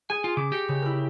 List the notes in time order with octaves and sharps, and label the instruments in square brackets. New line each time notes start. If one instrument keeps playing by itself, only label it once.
[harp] G#4 G#6 [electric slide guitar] G#5
[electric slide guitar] F4
[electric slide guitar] C#3 [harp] D6
[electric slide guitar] G4 [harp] A#6 C#7
[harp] C#3
E4 A#4